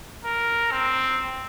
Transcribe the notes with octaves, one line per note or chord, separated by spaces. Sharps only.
A#4
C4